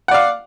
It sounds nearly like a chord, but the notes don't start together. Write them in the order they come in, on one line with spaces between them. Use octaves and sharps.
F#5 D5 F5